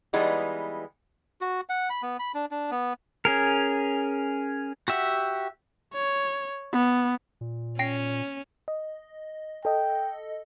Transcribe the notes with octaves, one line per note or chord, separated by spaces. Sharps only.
E3 G3 G#3 B3 D#4
F#4
F#5
B5
B3
B5
D4
D4
B3
C#4 G#4 A#4
F#4 G4 E5 F#5
C#5
B3
A#2
C#4 G5 A#6 C7
D#5
A4 D#5 G5